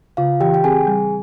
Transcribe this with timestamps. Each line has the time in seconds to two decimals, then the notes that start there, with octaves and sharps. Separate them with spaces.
0.17 C#3 F4 F5
0.40 E3 G4 G5
0.54 G5
0.64 C4 G#4 G#5
0.87 G3